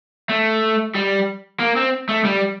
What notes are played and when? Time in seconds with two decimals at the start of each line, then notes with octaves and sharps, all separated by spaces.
0.29 A3
0.95 G3
1.60 A#3
1.76 C4
2.09 A3
2.25 G3